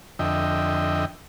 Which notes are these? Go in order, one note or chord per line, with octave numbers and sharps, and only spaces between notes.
F2 D3 D#5 E5 G5